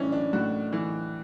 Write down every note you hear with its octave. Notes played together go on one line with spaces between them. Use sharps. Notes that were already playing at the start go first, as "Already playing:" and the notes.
Already playing: A2 E3 C#4 D4 E4
D4
A2 F#4
E3